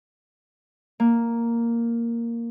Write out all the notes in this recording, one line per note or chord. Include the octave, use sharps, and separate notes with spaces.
A#3